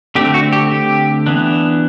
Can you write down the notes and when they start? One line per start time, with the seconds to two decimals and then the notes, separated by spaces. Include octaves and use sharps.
0.15 D3 A3 C4 G4
0.34 F#4
0.53 G4
0.71 G4
1.26 E3 B3 D4